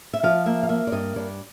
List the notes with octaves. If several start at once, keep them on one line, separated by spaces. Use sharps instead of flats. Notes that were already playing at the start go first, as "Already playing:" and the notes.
E5
F3 F5
A#3 E5
F5
A#3 E5
D5
G2 D#5
G2 D5